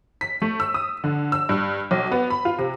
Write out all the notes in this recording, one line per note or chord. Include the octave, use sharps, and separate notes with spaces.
B6
A3
E6
D#6
D3
E6
G2
B1
B3
B5
F4
C3